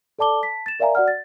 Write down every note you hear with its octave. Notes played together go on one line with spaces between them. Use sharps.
A4 D5 A5 D6 G7
A5 B6
A6 E7
A#4 D5 E5 F5 G#5 A#5
F#4 D5 F#5 F6
A6